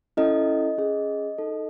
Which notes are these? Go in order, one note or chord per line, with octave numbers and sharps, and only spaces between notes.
C#4 E4 A4 D#5
C#4 G#4
D#4 A4